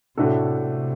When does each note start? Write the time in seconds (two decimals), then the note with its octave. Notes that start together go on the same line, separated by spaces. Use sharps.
0.17 A2 C3 A3 D4 F#4 A4
0.61 C3